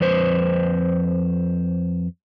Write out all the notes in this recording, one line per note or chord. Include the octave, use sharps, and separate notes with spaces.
F2 B4 C5